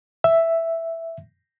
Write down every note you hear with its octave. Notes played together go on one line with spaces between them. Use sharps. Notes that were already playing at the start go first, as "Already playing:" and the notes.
E5